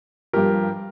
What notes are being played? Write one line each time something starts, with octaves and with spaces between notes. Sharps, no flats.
G2 F3 G4 A#4